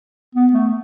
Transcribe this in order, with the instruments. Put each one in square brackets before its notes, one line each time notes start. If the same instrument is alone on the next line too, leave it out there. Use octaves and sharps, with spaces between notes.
[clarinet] B3
A3